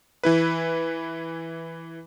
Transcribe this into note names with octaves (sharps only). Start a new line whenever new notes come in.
E3 E4 B4